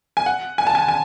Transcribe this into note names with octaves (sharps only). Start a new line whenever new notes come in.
G#5
F#5
G#5
A5
G#5
G#5